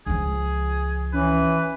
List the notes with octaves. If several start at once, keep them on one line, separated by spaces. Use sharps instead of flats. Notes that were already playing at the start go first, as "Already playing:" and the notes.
C#2 F3 G#4
E3 C#4 B4